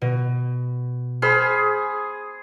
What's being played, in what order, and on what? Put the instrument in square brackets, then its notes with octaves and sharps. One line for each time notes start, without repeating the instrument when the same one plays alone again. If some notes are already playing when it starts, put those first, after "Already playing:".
[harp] B2
[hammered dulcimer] G#4 [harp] C5 B5 F6